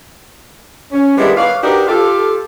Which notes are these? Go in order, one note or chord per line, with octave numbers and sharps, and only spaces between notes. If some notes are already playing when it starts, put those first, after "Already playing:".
C#4
D#3 G3 G#3 B3 D4 E4
B4 C#5 D5 F5
D4 D#4 F#4 G4 A#4 B4
F4 G4 A4